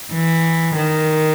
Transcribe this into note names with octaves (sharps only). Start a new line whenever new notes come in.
E3
D#3